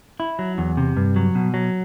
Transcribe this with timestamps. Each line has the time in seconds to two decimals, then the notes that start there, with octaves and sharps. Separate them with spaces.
0.20 E4
0.39 F#3
0.58 E2
0.77 C3
0.97 G2
1.16 F#3
1.35 B2
1.54 F#3